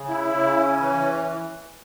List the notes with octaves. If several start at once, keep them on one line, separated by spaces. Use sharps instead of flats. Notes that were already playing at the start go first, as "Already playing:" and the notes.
Already playing: C#3
E4
C#3
C#4
E3